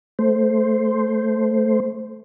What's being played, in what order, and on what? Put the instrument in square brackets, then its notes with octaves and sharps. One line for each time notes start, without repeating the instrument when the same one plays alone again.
[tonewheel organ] A3 C5